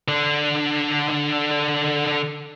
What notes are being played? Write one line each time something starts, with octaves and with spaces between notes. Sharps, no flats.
D3 D4